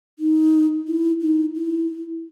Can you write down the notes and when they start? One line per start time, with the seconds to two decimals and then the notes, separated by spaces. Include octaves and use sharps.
0.19 D#4
0.87 E4
1.22 D#4
1.55 E4